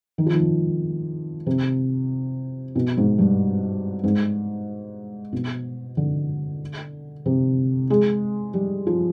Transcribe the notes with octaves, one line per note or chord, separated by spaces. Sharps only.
D#3
F3
D#3
C3
B2
G#2
G2
G#2
B2
D3
C3
G#3
G3
F3